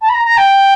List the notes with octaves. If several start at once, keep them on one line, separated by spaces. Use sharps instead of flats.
A5
B5
A#5
A#5
G5